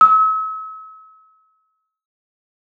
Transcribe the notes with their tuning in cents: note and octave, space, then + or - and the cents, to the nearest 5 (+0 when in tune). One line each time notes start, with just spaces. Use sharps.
E6 -40